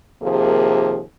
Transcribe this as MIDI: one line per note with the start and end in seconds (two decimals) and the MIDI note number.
0.23 1.03 39
0.23 1.03 48
0.23 1.03 53
0.23 1.03 58
0.23 1.03 68